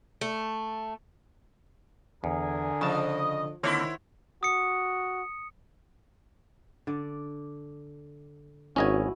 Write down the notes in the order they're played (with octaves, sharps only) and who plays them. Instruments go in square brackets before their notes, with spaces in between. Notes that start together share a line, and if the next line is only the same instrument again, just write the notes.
[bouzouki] A3
[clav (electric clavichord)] E2 [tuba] D3 [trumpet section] G#4 A#4 G#5
[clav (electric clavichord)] C#3 A5 [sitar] F3 [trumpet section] D#5
[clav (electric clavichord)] D3 A#3 C4 [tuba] D#3 [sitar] E4 C#5 [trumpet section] F#4 C5
[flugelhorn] F#4 [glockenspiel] D#6 C#7
[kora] D3 D5
[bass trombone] G#1 [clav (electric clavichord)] C#4 D#5 G#5 [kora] E4 F#4 B4